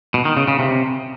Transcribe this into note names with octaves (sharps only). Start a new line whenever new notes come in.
B2
D#3
C#3
C#3
C3